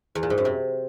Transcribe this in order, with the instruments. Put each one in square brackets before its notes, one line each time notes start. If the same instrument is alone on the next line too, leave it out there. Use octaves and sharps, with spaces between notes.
[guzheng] E2
A#2
G#2
F#2
C3